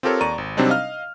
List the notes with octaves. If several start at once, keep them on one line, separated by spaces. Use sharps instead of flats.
C4 F4 G4 A4 A#4 C#5
D#2 D5 A#5 C#6 D#7
G#1
C3 F#3 G3 C4 D4 D#4
D#5 F5 F6